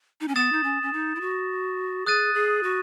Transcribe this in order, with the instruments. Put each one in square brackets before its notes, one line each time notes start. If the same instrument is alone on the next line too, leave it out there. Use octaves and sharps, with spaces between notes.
[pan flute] D#4
C#4
[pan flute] B3 [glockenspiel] D#6 A6 E7
[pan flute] D#4
C#4
C#4
D#4
E4
F#4
[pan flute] G#4 [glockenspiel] D#6 F#6 A6 D#7
[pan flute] G#4
F#4